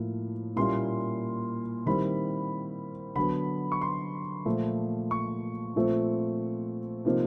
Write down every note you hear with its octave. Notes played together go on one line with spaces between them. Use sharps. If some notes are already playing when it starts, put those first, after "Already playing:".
Already playing: A2 F3 A#3
A#2 G3 A#3 C#4 E4 C6
D#3 G3 C4 E4 B5
D3 F#3 B3 B5
C#6
C6
A#2 F3 A3
C#6
A#2 F3 A3 C4 F4
C3 F3 A#3 D#4